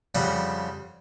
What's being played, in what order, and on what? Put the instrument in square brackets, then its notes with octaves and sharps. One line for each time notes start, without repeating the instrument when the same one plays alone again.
[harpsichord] F2 C#3 F3 G3 F#5